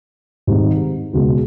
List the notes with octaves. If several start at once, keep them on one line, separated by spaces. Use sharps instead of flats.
G#2 D#3 G3 C4 D#4
C#2 B2 G#3 C#4 F#4